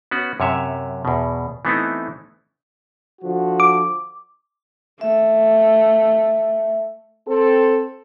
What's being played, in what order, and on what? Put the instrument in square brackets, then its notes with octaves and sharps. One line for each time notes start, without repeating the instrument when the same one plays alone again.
[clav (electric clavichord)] B3 C#4 F#4 B4
F#2 C3 C#5 E5
E2 B2
E3 A3 B3 C4 D#4 E4
[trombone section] D3 F3 F#4
[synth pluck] D6
[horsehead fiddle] A3 [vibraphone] E5
[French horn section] C4 A4